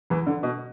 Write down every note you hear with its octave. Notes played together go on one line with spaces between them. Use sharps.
E2 E3
D3
B2